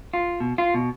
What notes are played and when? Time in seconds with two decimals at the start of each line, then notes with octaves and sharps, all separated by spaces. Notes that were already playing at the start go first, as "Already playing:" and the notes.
0.14 F4
0.40 B2
0.58 F4
0.74 B2